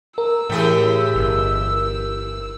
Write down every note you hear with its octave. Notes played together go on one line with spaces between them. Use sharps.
A#4 E6
A2 E3 G4 G#4
G1